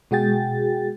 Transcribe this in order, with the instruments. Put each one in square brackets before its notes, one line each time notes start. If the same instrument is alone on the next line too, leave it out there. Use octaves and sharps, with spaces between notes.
[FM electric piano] B2 G#3 F#4 G#4 G5 A6